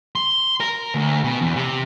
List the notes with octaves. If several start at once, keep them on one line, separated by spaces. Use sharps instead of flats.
C6
A#4
D2
B2
E2
C3